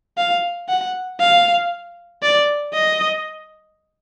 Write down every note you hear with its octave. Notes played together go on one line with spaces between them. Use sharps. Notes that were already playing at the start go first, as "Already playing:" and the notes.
F5
F#5
F5
D5
D#5